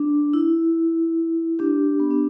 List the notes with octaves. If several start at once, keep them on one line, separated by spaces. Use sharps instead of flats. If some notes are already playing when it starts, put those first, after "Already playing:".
Already playing: D4
E4
D4 G4
B3
D4